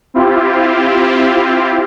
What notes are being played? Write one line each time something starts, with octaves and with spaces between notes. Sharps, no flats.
C4 E4 F4 G4